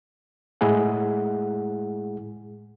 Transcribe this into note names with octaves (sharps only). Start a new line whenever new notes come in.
A2 G#3 E4 G#4 F#5